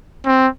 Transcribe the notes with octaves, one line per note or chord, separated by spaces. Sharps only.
C4